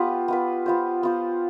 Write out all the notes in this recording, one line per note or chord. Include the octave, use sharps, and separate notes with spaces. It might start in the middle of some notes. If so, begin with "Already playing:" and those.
Already playing: B3 F4 G4 B4
B3 F4 B4
B3 F4 C5
B3 F4 C5